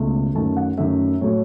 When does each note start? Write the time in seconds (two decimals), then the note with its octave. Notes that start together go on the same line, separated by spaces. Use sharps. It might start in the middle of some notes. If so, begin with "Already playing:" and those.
Already playing: C#2 B2 A3
0.35 F#2 D#3 A3 A5
0.57 F#5
0.78 F#2 D#3 A3 E5
1.21 A2 F#3 A3 C#5